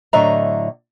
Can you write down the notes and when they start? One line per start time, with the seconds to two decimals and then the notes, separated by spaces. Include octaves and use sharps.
0.13 A2 D3 F#3 D#5 E5 A#5